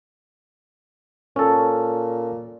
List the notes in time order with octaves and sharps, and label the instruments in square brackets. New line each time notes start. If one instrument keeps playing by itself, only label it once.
[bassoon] A#2 [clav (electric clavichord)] C#4 A4